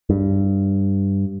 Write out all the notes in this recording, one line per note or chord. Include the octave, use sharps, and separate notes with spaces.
G2